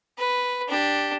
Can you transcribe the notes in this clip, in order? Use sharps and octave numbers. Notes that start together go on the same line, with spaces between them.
B4
D4 G4